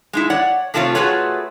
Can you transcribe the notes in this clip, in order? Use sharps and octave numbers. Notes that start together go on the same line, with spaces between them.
G#3 D#4 E4
C#5 D5 F#5
C3 A3 C4 F4 B4 C#5
A3 F4 F#4 G#4 B4 C#5